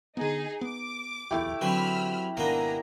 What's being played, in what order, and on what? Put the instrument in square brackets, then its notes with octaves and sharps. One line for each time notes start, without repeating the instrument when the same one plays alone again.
[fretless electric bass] D3 B3 [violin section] D#4 G#4
[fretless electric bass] B3 [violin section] D6
[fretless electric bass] D1 B1 E2 [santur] A3 E4 G4
[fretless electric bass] D3 [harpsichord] E3 F#3 C4 [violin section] B5 E6 F6
[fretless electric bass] G#1 B2 D#3 [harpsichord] A#3 B3 [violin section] D4 G#5 A#5